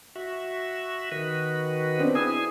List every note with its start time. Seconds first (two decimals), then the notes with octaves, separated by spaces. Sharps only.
0.16 F#4 E5
1.12 D#3 F#4 B4
1.98 B3 C4 D4
2.15 E4 G#4 G#5 D#6